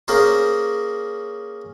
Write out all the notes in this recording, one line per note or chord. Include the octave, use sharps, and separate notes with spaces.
A#3 C#4 G#4 A#4 C5